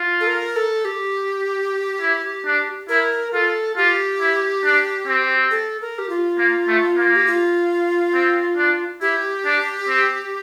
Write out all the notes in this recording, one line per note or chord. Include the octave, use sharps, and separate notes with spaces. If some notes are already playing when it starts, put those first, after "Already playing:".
Already playing: F4
A4
A#4
A4
G4
E4
D4
E4 A#4
F4 A4
F4 G4
E4
D4
C4
A4
A#4
G4
F4
A#3
A3
A#3
G4
F4
C4
D4
E4 G4
D4
C4